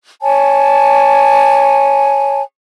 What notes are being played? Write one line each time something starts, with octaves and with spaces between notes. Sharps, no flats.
C#5 G#5 A5